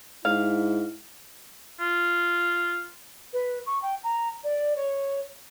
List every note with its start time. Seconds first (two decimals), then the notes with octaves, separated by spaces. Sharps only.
0.25 G#2 E4 F5
1.80 F4
3.33 B4
3.66 C#6
3.82 G5
4.03 A#5
4.43 D5
4.76 C#5